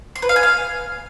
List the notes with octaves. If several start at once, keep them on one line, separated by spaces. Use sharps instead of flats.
C6
B4
F5
G#5
F5